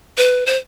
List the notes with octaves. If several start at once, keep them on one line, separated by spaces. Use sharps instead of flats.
B4
C5